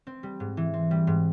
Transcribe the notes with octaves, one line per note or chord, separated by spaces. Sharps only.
C4
G3
G#2
E3
C4
G3
G#2